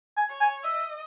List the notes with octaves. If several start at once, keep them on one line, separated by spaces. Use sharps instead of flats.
G#5
C#5
G#5
D#5 E5